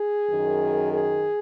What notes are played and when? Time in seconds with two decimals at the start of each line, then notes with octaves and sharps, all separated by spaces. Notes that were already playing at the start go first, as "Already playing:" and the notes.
Already playing: G#4
0.30 F#2 D#3
0.92 G#4